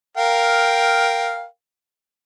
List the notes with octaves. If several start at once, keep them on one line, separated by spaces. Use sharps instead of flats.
A#4 F5 G5